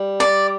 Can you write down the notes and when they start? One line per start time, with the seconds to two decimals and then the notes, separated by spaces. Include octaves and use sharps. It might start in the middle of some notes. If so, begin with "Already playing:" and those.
Already playing: G3
0.20 D5